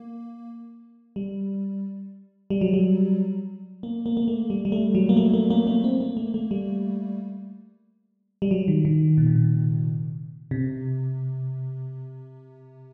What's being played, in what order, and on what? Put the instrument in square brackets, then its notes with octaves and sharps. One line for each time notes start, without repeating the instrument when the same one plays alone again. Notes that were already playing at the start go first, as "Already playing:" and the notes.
Already playing: [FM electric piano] A#3
G3
G3
F#3
G3
A#3
A#3
A#3
A3
G3
G3
A3
F#3
A#3
A3
A#3
A#3
A#3
C4
A#3
A3
A3
G3
G3
F#3
D#3
D#3
A#2
C3
A#2
C3